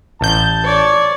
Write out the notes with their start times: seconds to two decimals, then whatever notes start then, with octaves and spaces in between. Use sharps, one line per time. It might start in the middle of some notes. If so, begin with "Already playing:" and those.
0.21 A1 A5 G6
0.64 C#5 D5